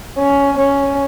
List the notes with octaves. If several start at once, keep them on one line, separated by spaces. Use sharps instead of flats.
C#4
C#4